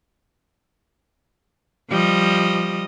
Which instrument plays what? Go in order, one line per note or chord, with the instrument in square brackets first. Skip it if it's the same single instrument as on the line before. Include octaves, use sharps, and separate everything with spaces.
[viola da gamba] F3 G3 D#5